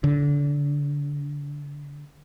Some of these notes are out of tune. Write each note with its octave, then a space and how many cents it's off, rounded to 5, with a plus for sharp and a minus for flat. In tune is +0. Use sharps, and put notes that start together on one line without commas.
D3 -25